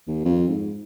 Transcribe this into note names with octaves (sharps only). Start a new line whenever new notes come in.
D#2
F2
G#2